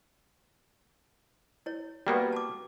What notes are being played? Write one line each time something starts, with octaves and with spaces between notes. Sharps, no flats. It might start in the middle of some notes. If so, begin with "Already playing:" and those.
E4 C#5
G3 A#3 B3 F#4 G4 B4
A5 D6